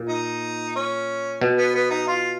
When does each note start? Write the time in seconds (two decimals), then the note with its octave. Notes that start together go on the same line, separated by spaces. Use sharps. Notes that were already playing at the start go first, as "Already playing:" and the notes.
Already playing: A#2
0.09 D#4
0.76 C#4
1.41 B2
1.58 B3
1.75 B3
1.91 D#4
2.08 F4